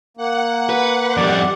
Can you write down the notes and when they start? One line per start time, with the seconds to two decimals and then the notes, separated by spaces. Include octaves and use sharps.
0.17 A#3 F#5
0.69 B4
1.17 F2 G3 D5